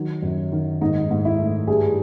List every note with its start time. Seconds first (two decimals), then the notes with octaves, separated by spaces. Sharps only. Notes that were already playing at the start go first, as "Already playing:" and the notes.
Already playing: D#3 F#3
0.22 F#2
0.52 D#3
0.81 G#2 D#4
1.10 G#2
1.25 E4
1.39 A3
1.68 G2 G#4